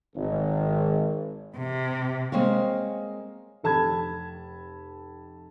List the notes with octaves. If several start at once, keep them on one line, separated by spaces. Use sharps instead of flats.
G#1
C3
G#3 A#3 C4 C#5 F5
F1 A4 A5 B5 G#6